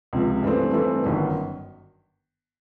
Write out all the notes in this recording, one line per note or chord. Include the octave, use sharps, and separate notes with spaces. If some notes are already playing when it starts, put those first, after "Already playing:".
C#2 C3 F3
G2 E3 A3 C4
G2 E3 A3 C4
G1 F#2 D#3